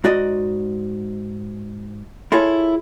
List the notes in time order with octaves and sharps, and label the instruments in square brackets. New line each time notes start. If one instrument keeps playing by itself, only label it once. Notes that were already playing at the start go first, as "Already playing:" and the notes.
[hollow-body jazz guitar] G#2 F#4 D5 D#5
E4 F4 G#4 A4 C#5